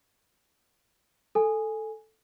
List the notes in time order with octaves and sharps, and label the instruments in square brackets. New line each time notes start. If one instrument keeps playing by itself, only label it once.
[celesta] A4 G#5